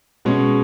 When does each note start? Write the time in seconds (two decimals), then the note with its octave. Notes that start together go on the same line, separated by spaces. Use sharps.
0.25 B2 G#3 C#4